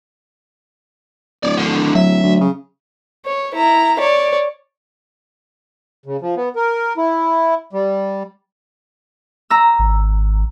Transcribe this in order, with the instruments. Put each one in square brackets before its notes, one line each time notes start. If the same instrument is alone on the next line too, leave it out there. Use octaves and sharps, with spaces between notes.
[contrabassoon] D1 [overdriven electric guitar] C#5 D5
[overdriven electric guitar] D3 D#3
[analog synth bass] F#3 [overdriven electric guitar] E5
[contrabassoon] D2
C#3
[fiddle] C#5
E4 A#5
C#5 D5
[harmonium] C#3
F3
B3
A#4
E4
G3
[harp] A#5 E6
[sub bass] G#1